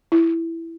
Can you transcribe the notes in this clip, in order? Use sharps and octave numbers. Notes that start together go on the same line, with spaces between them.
E4